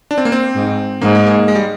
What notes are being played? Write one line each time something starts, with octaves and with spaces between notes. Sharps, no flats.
D4
C4
A#3
C4
G#2
G#2 A#3
G#3
A#3
G#3
G3